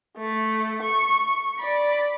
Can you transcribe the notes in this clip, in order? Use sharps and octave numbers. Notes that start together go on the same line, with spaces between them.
A3
C#6
D5 B5